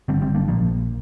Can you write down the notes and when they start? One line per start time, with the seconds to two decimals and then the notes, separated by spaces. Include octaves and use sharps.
0.08 G1 G2 D3 G3 C4
0.22 G3 C4
0.35 A#3 D4
0.48 A#1 A#2 F3 A#3